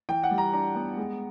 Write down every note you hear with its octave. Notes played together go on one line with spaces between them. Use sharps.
E3 G5
F#5
G3
A#5
D4 A#5
B3
G#3